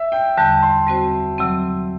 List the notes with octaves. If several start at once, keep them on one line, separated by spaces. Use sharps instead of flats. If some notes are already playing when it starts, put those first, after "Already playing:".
Already playing: E5
G5
E2 D3 G3 A5
C6
G3 C4 F#4 C5
C3 F#3 C4